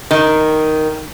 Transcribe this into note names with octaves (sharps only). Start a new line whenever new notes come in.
D#3